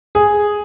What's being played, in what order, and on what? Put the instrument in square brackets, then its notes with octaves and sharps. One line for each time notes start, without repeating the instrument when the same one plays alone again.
[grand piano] G#4